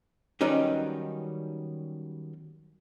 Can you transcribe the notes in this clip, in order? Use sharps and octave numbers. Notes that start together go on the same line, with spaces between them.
D#3 F#3 G3 B3 C#4 D#4